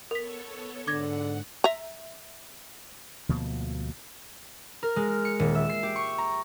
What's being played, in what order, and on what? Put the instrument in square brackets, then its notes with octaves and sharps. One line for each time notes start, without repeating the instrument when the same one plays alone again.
[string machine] B3 A4 C#5 [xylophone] A#4 B6
[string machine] G#2 F#5 [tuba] D3 [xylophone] D6 G#6 A#6
[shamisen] E5 A#5
[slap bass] D2 B2 F3 A#3
[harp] A#4
G#3
F6
C#7
D#1
E5
C7
G4
C#6
A#5